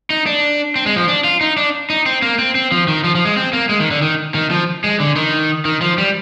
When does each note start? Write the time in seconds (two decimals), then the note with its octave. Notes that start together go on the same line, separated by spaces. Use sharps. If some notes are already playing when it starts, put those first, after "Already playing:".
0.10 D#4
0.26 D4
0.76 C4
0.86 G#3
0.97 F3
1.08 D4
1.24 F4
1.41 D#4
1.57 D4
1.90 D#4
2.06 C4
2.22 A#3
2.39 C4
2.55 C4
2.72 F3
2.88 D#3
3.04 F3
3.15 F3
3.25 G#3
3.36 C4
3.53 A#3
3.69 G#3
3.80 D#3
3.91 D3
4.02 D#3
4.35 D#3
4.51 F3
4.84 G#3
5.00 D3
5.16 D#3
5.65 D#3
5.81 F3
5.98 G3